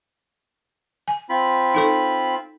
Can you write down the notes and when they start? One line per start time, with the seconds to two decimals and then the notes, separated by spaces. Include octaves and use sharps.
1.08 G#5
1.29 C4 F4 B5
1.74 D#4 A4 C#6